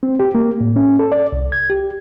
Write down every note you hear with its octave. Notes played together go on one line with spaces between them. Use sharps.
C4
G4
A#3
A2
C#4
A4
D5
C2
G#6
G4